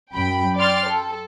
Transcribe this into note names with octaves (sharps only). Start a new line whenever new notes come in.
F#2 G5 B5
D5 G5 C6 F6 A6
A4